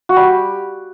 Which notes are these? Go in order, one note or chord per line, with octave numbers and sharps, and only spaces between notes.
F#4
G3 G4